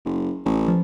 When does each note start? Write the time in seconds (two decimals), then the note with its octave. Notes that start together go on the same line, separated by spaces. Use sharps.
0.05 F#1
0.45 A1
0.68 F3